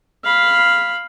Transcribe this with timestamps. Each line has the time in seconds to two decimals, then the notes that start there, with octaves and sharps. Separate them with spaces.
0.24 F5 B5